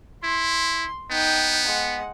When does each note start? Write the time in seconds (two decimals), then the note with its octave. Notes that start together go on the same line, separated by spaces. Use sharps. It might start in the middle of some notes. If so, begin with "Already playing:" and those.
0.23 E4 C6
1.11 B3 D#4 G5
1.66 G#3 F#5